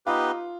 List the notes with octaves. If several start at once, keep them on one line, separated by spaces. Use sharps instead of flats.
B3 D#4 F4 G4 B4 D#5